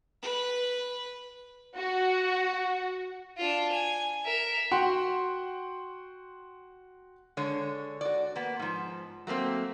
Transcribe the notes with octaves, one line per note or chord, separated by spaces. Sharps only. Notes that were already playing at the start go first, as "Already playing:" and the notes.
B4
F#4
D4 F4
G#5
A#4 E5
F#4 F#5 G5 C6
D3 G#3 C#5
F#4 D5
A#3 B3
G#2 F3
F#3 A3 A#3 C4